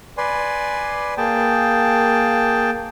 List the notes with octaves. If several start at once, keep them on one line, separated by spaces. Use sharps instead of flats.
B4 D5 G#5 C6
A#3 G#4 G5 A5